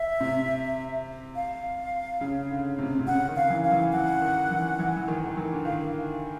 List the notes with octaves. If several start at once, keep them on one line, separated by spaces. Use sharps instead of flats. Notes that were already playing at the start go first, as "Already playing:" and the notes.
Already playing: E5
C3
F5
C#3
D3
C3
C3
C#3 F#5
D#3
F5
E3
F5
E3
E3 F#5
D#3
E3
E3
E3
D#3
D#3
E3
D3
D#3 F5